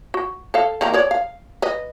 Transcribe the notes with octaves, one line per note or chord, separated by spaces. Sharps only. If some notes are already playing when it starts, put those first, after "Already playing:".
F#4
A4 F5
D#3 A#3 A#5
G#4 C#5 D5
F5
B4 D#5